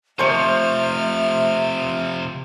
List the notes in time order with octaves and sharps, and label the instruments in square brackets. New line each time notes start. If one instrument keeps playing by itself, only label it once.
[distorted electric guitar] C3 F3 [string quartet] A3 F6 [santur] C5 C#6 [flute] E5